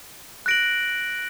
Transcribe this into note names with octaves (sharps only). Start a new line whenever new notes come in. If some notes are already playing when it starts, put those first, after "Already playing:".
F#6 A#6 D7 F#7